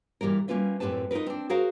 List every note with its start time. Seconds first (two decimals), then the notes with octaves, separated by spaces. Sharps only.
0.21 A#2 E3 G3 A#3 A#4
0.48 G3 A#3 C#4 F4 B4 E5
0.80 F#2 A2 C4 G4 B4 A5
1.11 D#4 F4 G4 A#4 B4
1.26 C4 D4
1.50 F#4 G#4 A#4 C5 F5